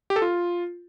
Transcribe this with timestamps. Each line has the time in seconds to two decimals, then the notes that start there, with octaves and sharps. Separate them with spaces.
0.10 G4
0.16 A4
0.22 F4